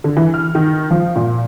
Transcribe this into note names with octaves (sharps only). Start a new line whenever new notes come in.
D3
E3
F6
D#3
F3
A#2